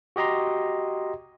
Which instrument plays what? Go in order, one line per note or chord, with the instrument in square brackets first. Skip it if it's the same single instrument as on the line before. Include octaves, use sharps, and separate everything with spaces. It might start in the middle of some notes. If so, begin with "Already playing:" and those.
[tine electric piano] F#4 G4 D#5 A#5 C6